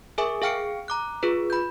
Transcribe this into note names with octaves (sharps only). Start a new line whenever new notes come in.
G#4 A#4 E5 G#5 D6
G#4 F5 G5 F6 C#7 D7
A#5 D6 F#6
F4 G#4 B4
B5 G6